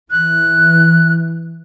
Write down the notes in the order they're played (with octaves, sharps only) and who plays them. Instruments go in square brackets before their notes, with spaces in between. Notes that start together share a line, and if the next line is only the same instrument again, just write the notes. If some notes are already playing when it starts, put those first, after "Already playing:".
[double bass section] E3 [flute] F#6